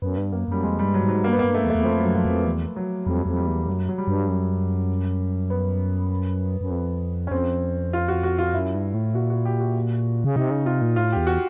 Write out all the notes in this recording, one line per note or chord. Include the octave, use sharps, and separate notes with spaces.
F#2 B3
G2
F#2 A#3
F#2 G3
F2 G#3
G2 G3
F#3
G#2
F#3
G2 A#3
B3
A#3
G2
A3
E2
A3
E2
F2 F3
F#3
F#2
F3
F2
E2
F#3
F2 G3
F2
G3
E2
F#2 F#3
F#3
G3
G2
F#2
B3
F#2
F2
C#4
F2 C4
F4
F#4
F#4
F4
F#2 E4
G2
A2
A#2 F#4
F#4
G4
F#4
C#3
C3 D#4
C#3
C3 F4
A#2
A2 F4
E2 G4
F#4